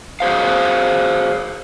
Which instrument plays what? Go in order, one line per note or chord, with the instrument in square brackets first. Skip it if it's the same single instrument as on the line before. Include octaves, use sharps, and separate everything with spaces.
[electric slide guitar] F#4 G#4 C5 F5